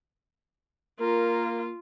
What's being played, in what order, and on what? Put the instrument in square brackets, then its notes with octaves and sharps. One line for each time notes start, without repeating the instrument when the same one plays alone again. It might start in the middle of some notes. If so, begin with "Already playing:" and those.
[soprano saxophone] A#3 [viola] F4 [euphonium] A#4